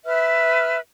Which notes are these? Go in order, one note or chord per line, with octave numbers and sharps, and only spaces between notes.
B4 E5 F6